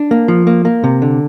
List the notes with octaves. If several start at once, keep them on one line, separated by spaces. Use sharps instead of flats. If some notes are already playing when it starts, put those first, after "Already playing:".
Already playing: D4
A#3
F3
A#3
A#3
C3
D3